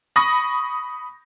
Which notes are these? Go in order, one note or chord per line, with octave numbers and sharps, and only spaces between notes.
B5 C#6 D#6 A#6